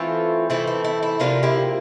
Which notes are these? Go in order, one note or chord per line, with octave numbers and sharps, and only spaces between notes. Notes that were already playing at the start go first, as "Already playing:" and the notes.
Already playing: E3 A3 C4 F4 A4
E3 A3 C4 E4
E4
E4
E4
C3 F3 A#3 D4 F4
E4 G4